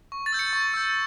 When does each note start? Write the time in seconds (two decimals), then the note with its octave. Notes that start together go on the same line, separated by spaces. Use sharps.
0.12 C#6
0.26 A6
0.33 E6 G6
0.39 C#7
0.53 C#6
0.74 E6 G6